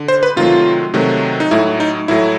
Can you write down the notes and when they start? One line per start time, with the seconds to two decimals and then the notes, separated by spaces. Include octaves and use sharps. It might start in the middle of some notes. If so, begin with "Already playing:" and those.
Already playing: D3
0.08 C5
0.23 B4
0.36 C3 D#3 F#3 A3 F4
0.94 C3 D#3 F#3 A3
1.40 D#4
1.51 A2 F#3 A3 E4
1.80 D#4
2.08 A2 F#3 A3 E4